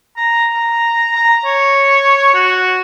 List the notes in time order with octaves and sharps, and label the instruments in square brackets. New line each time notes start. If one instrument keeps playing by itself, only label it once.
[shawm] A#5
A#5
A#5
C#5
F#4